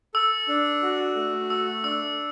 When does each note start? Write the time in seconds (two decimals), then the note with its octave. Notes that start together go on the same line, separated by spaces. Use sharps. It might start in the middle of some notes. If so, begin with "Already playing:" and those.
0.14 A4 E6
0.48 D4
0.82 F#4
1.16 A3
1.49 A4 E6
1.84 D4 E6